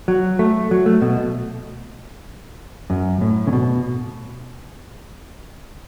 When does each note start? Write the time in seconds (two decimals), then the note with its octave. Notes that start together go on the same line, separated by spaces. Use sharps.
0.08 F#3
0.39 A3
0.71 F#3
0.86 A3
1.02 B2
2.90 F#2
3.21 A2
3.47 C#3
3.53 B2